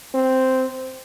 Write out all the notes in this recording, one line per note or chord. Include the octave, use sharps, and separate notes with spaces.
C4